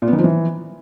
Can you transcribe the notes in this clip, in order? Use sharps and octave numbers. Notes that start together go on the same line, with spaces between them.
A#2
B3
D#3
F3
E3